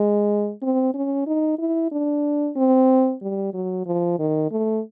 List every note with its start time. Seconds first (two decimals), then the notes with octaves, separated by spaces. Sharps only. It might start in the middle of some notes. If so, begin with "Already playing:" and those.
Already playing: G#3
0.62 C4
0.94 C#4
1.27 D#4
1.59 E4
1.91 D4
2.56 C4
3.22 G3
3.54 F#3
3.86 F3
4.19 D#3
4.51 A3